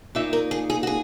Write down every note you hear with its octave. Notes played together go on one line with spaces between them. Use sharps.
A#2 A#3 D#4 E5
A#4
G#4
G#4
F#4
G#4